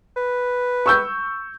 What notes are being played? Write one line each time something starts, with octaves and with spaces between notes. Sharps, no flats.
B4
C#6 E6 G6